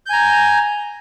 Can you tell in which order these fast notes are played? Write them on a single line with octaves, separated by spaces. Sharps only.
G6 G#5 A#5